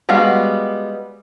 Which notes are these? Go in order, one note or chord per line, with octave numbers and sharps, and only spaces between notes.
G3 G#3 B3 F#4 F5